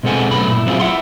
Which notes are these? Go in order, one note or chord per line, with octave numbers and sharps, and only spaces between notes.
B2 G#3 C4 A4 F#5 G#5
B1 F#2 A3 B3 B5
A#2 E4
F#3 B3 C4 E4 F4 G#4
E4 E5 F#5 C6